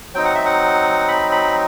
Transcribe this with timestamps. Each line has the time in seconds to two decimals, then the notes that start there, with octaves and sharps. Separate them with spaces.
0.14 F#3 C4 D#4 G5
0.25 F#5
0.35 E5
0.45 F#5
1.08 B5
1.32 B5